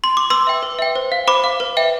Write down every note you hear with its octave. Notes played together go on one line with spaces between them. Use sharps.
C6
D6
B4 C6 E6
E5 G5
B4
E5 G5
C5
F5
C5 B5 D6
F5
B4
E5 G5